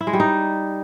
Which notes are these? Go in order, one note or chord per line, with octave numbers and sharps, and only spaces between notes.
E4
G#3
G3
D#4